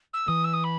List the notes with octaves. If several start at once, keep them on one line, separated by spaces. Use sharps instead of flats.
E6
E3 D#6
E6
D#6
B5